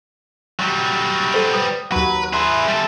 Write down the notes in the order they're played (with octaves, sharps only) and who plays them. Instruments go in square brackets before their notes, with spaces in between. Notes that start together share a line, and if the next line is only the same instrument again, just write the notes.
[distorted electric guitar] F#3 G3
[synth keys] A4 C5 D#7
B4 D#6
[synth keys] D#2 F#3 [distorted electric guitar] B4
[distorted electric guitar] G#4 B4 [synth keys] E5 A#5 C6
[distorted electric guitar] G3 A4